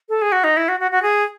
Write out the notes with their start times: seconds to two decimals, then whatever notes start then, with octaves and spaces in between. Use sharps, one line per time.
0.09 A4
0.22 G#4
0.32 F#4
0.44 D#4
0.57 E4
0.68 F#4
0.80 F#4
0.91 F#4
1.02 G#4